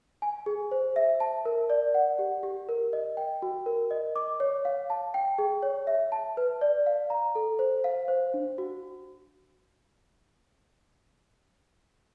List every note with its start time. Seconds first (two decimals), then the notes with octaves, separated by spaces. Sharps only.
0.22 G#5
0.46 G#4
0.71 C5
0.96 E5
1.20 A5
1.45 A#4
1.70 D5
1.94 F#5
2.19 G4
2.43 G4
2.69 A#4
2.93 D#5
3.17 G5
3.42 F#4
3.66 A#4
3.91 D#5
4.16 D6
4.40 C#5
4.65 F5
4.90 A5
5.14 G5
5.38 G#4
5.63 C#5
5.87 E5
6.12 A5
6.37 B4
6.61 D5
6.86 F5
7.10 A#5
7.35 A4
7.59 C5
7.84 F5
8.08 C5
8.34 D4
8.58 F#4